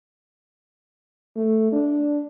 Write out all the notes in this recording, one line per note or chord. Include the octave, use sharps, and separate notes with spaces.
A3
D4